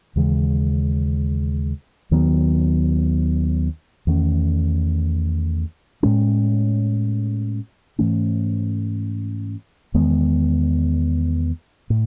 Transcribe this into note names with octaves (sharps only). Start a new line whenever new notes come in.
D#2 C#3 E3 G#3
D#2 D#3 F#3 B3
E2 D#3 A3 C#4
A2 G#3 C#4
G#2 E3 A3 C#4
E2 D#3 G#3 B3
A2